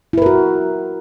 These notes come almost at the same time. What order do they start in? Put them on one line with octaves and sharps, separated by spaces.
E4 B4 A#4 F#4